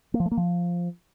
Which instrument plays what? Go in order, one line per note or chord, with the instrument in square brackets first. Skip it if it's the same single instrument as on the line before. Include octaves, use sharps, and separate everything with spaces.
[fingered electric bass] A#3
F3
A3
A#3
F3